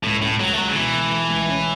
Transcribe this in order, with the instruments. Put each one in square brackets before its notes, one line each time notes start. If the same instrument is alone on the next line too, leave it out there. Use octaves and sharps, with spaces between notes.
[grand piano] C#2 [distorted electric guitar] A2
[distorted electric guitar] A2 [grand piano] C#4
[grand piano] C#2 [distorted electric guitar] F#3
[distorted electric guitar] A3
[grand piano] C#2 [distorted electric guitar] F#3
[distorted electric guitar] C#3
[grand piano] B2 [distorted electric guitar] E3
[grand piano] A3
A3
C#2
C#4